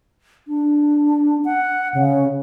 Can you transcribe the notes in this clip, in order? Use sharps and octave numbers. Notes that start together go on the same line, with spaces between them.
D4
F#5
C#3